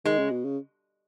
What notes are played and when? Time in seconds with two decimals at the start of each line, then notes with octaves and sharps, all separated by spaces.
0.05 D#3 G#3
0.19 C#3
0.31 B2
0.45 C#3